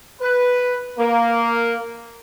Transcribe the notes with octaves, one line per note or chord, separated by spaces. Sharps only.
B4
A#3